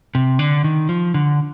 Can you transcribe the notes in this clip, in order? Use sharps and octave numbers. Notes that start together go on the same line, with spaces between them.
C3
D3
D#3
F3
D3